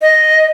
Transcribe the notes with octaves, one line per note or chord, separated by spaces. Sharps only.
D#5